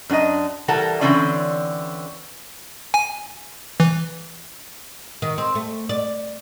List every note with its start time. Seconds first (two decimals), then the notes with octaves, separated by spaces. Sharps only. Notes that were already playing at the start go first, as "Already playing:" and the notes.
0.09 F#2 D4 F#4 D#5
0.68 E3 G3 A4 A#4 F#5 A5
1.01 D3 E3 C4 C#4 F4 D5
2.94 G#5
3.80 E3
5.22 D#3
5.38 C4
5.55 A3
5.89 D5